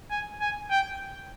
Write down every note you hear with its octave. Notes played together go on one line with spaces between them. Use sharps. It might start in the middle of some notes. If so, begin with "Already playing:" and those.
G#5
G#5
G5